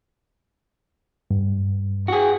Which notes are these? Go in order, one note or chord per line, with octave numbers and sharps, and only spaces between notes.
G2
F#4 G#4